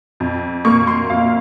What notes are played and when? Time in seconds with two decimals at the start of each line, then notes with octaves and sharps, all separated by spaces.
0.20 F2
0.65 A#3 C#6
0.87 C6
1.10 F2 F5